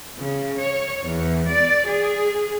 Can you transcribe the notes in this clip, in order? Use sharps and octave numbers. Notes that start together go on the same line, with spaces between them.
C#3
C#5
E2
D5
G#4